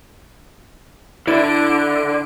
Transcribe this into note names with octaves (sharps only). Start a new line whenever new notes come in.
D3 E4 D7